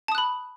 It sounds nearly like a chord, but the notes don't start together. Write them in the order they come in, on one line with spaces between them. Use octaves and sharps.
A5 D#6 F#6 B5